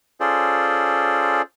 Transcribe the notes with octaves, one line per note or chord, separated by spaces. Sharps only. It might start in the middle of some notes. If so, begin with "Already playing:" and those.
C#4 F4 G#4 A4 C5 D5